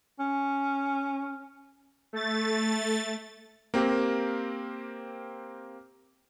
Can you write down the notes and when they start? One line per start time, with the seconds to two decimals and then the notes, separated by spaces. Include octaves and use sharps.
0.19 C#4
2.13 A3 A6
3.74 A#3 C4 G4 A#4